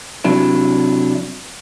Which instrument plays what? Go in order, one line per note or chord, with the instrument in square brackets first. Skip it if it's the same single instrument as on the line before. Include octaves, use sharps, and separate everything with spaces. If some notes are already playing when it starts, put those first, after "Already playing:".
[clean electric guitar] C3 F#3 D4 E4